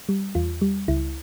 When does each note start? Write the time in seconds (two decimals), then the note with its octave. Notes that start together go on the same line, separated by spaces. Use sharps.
0.09 G3
0.35 E2 F4
0.61 G3
0.88 C#2 E4